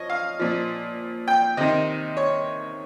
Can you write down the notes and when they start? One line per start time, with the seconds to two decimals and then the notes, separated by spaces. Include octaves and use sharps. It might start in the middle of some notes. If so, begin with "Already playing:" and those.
Already playing: F3 C#5 D#5
0.10 F5
0.39 A#2 F3
1.28 G5
1.57 C3 D#3 D#5
2.17 C#5